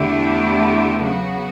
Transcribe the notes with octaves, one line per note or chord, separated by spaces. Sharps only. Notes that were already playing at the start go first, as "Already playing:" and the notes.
Already playing: E2 D3 A3 E4 G4
C#3 F#3 B3 F#4